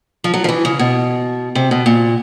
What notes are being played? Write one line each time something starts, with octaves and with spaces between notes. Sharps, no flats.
F3
F#3
F3
E3
C#3
B2
C3
B2
A#2